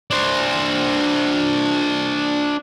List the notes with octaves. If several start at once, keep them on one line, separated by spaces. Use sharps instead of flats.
D4 C5